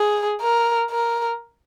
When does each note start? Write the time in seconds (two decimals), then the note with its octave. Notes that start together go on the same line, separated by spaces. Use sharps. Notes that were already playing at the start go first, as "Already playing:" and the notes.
Already playing: G#4
0.41 A#4
0.91 A#4